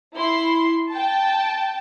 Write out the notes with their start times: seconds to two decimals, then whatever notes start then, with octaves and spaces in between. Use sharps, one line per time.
0.16 E4 C6
0.91 G5 A5